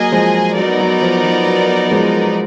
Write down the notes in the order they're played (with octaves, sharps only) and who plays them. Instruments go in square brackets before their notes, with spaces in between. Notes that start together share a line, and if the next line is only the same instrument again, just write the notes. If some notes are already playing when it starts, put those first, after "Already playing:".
Already playing: [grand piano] F#3 A#3 [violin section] G#4 D#5 G#5
[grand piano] F3 G#3
[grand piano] F#3 [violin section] B3 D#4 A#4 D5
[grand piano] F#3
F3
F3
F#3
F3 G#3